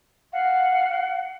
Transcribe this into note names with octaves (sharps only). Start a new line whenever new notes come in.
F5 F#5